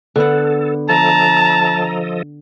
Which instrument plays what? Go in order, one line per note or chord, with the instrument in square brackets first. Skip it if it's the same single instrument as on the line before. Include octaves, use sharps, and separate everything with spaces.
[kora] D3 B3 F#5 [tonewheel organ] A4
[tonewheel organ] F3 A4 D#5 [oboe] A5 [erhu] A#5